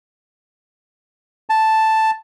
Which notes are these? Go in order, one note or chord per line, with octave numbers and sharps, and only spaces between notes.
A5